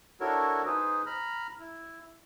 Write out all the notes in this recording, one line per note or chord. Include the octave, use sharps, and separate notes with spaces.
D4 E4 F#4 A4 A#4 C#5
D#4 G#4 B4 C5
A#5 B5 F6
E4